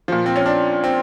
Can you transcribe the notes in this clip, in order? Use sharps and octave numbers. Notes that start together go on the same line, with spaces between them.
A#2 F3
C4
C#4
D4
C4